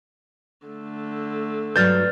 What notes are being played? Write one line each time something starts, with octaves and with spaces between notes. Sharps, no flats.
D3 A3
G2 F#3 B4 D5 F6 G6 A6